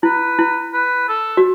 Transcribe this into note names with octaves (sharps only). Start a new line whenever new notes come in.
E4 B4
E4
B4
A4
F#4